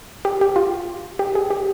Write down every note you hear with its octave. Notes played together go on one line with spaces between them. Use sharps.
G4
G4
F4
G4
G#4
G4